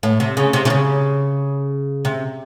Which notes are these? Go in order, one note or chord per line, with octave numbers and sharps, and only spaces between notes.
A2
C3
C#3
C3
C3
C#3
C3